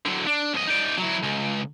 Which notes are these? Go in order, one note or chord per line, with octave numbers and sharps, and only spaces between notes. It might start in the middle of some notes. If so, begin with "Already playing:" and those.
D3 F#3
D4
C2 D#5
D#4 D5
F#3 E4
C#2